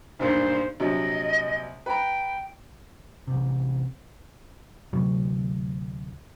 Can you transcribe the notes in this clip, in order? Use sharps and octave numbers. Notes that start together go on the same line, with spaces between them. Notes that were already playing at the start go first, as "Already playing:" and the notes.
B1 G2 A#2 C5
A#1 C3 F#3 D#5
B4 G5 A#5
A1 C3
D2 A2 C3 F#3